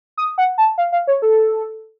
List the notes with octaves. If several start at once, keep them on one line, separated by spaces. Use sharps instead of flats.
D#6
F#5
A5
F5
F5
C#5
A4